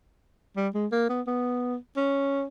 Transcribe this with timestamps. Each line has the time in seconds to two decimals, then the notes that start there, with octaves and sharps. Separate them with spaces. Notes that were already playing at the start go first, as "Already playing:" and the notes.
0.57 G3
0.74 G#3
0.92 A#3
1.09 B3
1.27 B3
1.97 C#4